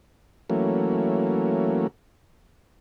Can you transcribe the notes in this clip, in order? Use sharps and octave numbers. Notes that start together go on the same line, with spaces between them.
E3 F#3 A3 A#3 C#4